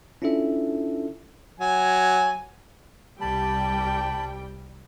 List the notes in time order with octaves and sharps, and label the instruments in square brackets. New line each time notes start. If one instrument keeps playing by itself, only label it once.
[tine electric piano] C#4 D4 E4 F4 A4 E5
[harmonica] F#3 G#5
[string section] C2 G3 G5 [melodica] A5 B5